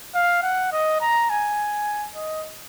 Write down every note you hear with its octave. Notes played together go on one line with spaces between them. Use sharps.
F5
F#5
D#5
A#5
G#5
D#5